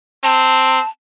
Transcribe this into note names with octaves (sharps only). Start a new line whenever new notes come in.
C4 A5